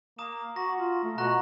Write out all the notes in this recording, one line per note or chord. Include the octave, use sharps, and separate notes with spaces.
A#3 A#5 D#6 E7
F#4 A#6
F4
A3
B2 F#4 A#5 F#6 A#6